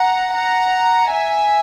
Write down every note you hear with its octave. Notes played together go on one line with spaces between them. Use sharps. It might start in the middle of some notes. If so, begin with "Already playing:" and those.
Already playing: F#5 A#5
F#5 A#5
E5 G#5